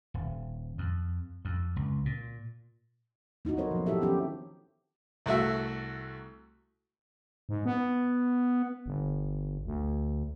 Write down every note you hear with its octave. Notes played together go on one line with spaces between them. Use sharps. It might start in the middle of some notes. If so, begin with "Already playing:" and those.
D#1
F2
F2
C#2
A#2
A#3 D#4 E4 F#4
F#3 C4 A4 A#4 C5 C#5
F3 B3
E4 F#4 G4 A4 E5
D#3 B3 C#4 F#4 G4
C2 A3 F#4 E5
G#2
B3
G1
D2